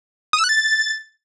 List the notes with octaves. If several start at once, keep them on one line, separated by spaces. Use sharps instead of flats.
D#6
E6
F#6
A6